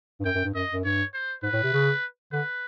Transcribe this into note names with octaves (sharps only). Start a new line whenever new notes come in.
G2
F#2 G5
F#2
G2
F#2 D#5
F#2
G2 C#5
C5
G#2 B4
A2
C3
C#3
D3 B4